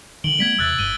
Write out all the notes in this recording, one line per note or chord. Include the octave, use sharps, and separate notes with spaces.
D3 D#3 D7 F#7 G7
G3 A3 B3 G#6 B6 D7
E2 C3 E6 F#6 A6
G1 G2 D#7 G7